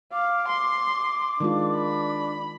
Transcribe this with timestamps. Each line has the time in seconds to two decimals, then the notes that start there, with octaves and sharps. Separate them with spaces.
0.13 F5 D6
0.48 C6
1.40 D#3 G#3 D4 F4
1.76 B5